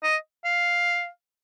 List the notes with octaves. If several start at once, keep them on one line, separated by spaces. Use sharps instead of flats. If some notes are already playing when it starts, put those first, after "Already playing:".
D#5
F5